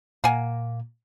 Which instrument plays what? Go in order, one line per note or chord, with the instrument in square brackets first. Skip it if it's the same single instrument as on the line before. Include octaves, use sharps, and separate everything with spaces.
[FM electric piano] A#2 [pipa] A#3 F#5 G#5